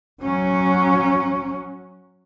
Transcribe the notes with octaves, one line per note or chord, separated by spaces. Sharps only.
F#3 C#4